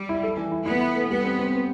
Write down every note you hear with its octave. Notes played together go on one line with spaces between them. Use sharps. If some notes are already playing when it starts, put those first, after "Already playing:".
Already playing: G3
E4
A4
E3
E4
B3 E4
E4
A3
G3 B3
C4
C4
C4